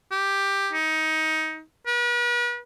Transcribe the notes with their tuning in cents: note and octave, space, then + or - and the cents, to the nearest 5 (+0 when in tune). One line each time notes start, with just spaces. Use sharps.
G4 +10
D#4 +20
B4 -40